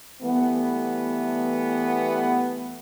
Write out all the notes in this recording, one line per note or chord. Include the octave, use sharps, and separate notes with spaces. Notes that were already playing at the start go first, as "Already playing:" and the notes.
E3 G3 A3 B3